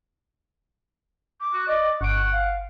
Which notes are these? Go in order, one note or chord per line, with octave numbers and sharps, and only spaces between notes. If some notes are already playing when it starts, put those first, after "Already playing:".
D6
F#4
D5 D#5
G1 F#5 C#6 D7
F5